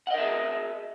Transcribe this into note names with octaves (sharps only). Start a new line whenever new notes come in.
G#4 A#4 D#5 E5 F#5